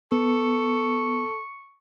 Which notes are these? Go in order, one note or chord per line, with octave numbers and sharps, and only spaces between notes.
B3 A4 C#6